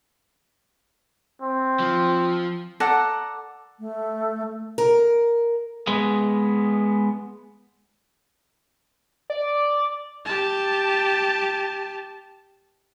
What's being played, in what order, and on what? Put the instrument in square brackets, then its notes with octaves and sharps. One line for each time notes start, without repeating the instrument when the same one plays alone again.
[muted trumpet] C4
[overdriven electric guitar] F3
[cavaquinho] A4 D5 F#5 A#5
[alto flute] A3
[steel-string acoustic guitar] A#4
[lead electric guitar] G#3 B3
[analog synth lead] D5
[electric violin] G4 A5